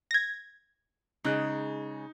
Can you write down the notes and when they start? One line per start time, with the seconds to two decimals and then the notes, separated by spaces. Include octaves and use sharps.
0.11 G#6 A#6
1.24 C#3 G#3 D#4 F#6